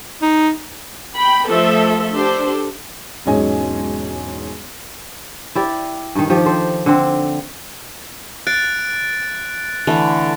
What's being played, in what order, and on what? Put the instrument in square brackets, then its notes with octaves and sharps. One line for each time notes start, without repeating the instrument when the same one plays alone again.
[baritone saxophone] D#4
[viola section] G5 B5
F3 A3 A4 E5
D4 G4 A4 C5
[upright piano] E1 G#2 F#3 C#4 D#5 G#5
[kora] E4 G4 D5
G2 D#3
D#3 F3 G4
A4 C5
D3 C4
[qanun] F5 [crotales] F#6 A6 D7
[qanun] D3 E3 A3